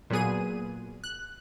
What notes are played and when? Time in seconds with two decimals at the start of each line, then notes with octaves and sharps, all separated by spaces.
0.10 A#2 F#3 B3 G#4 D#7
1.04 F#6